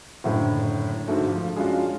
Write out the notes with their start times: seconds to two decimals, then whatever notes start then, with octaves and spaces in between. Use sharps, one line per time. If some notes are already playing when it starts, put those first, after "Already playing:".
0.24 F#1 A2 D3
1.07 G#2 D3 A3 F#4
1.28 F3
1.56 G#3 C#4 D4 F4 F#4